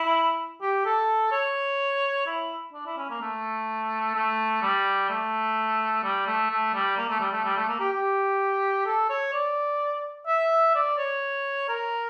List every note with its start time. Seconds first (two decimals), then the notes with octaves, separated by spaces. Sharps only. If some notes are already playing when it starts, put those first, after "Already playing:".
Already playing: E4
0.61 G4
0.85 A4
1.32 C#5
2.26 E4
2.73 D4
2.86 E4
2.97 C#4
3.10 A#3
3.21 A3
4.15 A3
4.62 G3
5.09 A3
6.03 G3
6.27 A3
6.50 A3
6.74 G3
6.97 A#3
7.09 A3
7.20 G3
7.32 A3
7.44 G3
7.56 A3
7.68 A#3
7.80 G4
7.92 G4
8.86 A4
9.09 C#5
9.33 D5
10.27 E5
10.75 D5
10.98 C#5
11.68 A#4